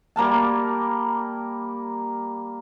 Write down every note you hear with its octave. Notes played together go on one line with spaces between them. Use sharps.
G3 A#3 A#4 A5